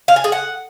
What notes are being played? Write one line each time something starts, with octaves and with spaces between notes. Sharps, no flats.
F5
G#5
G#4
F#5